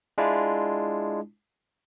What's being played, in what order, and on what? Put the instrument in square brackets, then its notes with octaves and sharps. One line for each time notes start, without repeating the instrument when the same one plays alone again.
[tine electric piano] G#3 D4 E4 F4